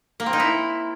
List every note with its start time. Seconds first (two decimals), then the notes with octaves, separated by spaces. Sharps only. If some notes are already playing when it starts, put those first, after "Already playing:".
0.20 A#3
0.26 C4
0.33 D#4
0.40 E4